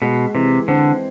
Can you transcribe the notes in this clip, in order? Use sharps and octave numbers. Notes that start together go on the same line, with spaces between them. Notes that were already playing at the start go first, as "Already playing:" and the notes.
B2 G#3
C3 E3
D3 C4